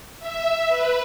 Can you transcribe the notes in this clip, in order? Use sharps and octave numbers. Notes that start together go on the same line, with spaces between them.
E5
B4